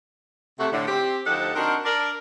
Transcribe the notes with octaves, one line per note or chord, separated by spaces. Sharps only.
C3 A3 F#4
A2 D3
C4 G4
D2 F3 D#4 G4 A4 F#5
C4 D4 D#4 F#4 A#4
D4 A#4 D5